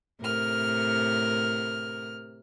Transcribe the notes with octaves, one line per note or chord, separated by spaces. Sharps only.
A2 C3 A#4 F6